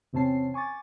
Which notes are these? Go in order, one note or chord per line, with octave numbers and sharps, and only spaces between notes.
E2 C3 C4 C#4 A5 C7
G#5 C#6 D6 A6